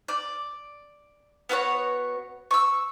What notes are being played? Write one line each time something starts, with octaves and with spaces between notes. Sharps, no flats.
D5
B3 F#4 A4 C#5
C#6 E6